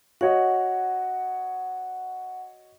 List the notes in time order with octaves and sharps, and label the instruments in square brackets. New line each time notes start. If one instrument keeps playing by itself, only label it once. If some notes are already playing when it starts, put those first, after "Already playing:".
[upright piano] F#4 C#5 D#5 [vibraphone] F#5